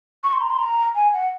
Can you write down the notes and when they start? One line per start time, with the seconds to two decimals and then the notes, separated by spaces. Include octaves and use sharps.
0.24 C#6
0.33 C6
0.41 A#5
0.50 C6
0.59 A#5
0.95 G#5
1.13 F#5